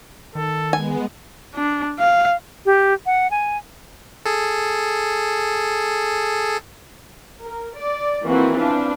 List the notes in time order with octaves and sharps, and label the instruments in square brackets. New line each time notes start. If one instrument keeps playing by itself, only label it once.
[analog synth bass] D#3 [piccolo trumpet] A4
[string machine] G#3 B3 [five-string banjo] G#5
[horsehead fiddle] D4
F5
[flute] G4
F#5
G#5
[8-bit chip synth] G#4 A4
[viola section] A#4
D5
E3 F3 A#3 C4 E4 F#4
C4 D4 B4 F5